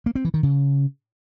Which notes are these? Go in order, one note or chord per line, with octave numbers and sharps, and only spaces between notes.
A#3
C4
E3
D#3
C#3